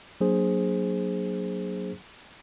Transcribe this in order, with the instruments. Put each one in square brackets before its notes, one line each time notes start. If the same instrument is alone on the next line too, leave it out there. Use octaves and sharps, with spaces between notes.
[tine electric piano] F#3 A#3 D4 G#4 C5